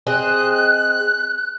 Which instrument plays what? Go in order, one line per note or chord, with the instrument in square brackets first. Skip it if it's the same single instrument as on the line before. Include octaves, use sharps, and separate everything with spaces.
[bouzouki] C4 G#4 D#5 [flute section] F#6